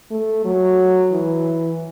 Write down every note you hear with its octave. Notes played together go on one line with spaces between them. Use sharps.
A3
F#3
E3